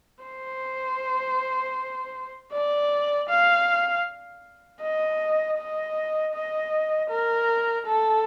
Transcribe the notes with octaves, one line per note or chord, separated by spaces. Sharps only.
C5
D5
F5
D#5
D#5
D#5
A#4
A4